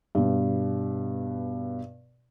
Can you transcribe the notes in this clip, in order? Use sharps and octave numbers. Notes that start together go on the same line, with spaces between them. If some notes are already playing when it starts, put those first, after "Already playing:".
G2 B2